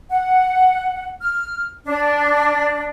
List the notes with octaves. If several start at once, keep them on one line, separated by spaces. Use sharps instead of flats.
F#5
F6
D4